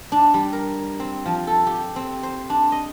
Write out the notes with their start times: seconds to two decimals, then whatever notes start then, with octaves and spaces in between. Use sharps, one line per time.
0.12 D4
0.34 G3
0.53 A#4
1.00 C4
1.26 F3
1.47 A4
1.67 G4
1.96 C4
2.23 C5
2.50 D4
2.72 D#5